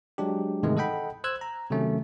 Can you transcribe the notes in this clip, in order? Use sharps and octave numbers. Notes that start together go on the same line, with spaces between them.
F#3 G#3 D4 G4
G#2 C3 D#3 E3 G#3 A3
A4 D#5 F#5 G5 B5
C5 E6 F#6 G#6
A#5
C3 D#3 F#3 A3 C#4